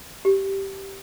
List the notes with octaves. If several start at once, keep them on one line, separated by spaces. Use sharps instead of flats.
G4